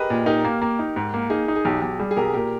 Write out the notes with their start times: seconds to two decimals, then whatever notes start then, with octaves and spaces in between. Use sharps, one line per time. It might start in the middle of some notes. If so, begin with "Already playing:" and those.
Already playing: G4 G#4 A#4 B4 D#5
0.10 A#2
0.26 D#4 G4 A#4
0.44 A#3
0.62 A#3
0.79 D#4
0.96 G#2
1.14 A#3
1.30 D#4 G#4
1.48 D#4
1.56 G#4
1.65 B1 G4
1.82 B1
1.99 G3 G#4
2.11 G#4
2.17 B1 G4 A#4
2.34 A#2 G4 A#4